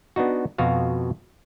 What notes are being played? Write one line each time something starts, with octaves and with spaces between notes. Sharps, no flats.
B3 D4 D#4 F#4
F2 B2 F4 F#4 F5